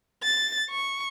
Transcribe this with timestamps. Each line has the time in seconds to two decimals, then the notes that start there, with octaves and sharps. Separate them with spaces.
0.23 A6
0.71 C#6